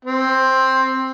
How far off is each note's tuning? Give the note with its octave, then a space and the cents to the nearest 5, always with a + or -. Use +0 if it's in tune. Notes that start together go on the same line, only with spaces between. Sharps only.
C4 +10